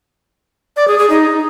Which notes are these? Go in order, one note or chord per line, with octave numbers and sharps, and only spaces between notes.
D5
G#4
G#4
D#4